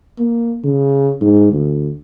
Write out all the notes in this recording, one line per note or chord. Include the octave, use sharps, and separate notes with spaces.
A#3
C#3
G#2
D2